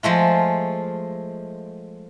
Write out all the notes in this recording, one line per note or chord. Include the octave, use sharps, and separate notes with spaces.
F3 G#3 A3 F4